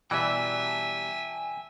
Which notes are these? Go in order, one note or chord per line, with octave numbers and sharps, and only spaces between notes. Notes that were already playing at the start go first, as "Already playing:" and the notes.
B2 E3 G3 E5 G5 G#5